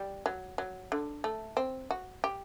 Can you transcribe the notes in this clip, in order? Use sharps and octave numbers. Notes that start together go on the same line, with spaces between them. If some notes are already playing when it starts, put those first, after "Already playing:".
Already playing: G3
F#3
F#3
D3
A3
C4
F#4
G4